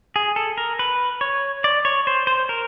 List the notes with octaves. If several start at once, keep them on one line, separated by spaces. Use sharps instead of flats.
G#4
A4
A#4
B4
C#5
D5
C#5
C5
C5
A#4